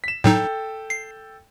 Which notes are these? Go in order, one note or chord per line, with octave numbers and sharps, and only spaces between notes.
B6 E7
A2 F#3 D#4 A4 G5
C7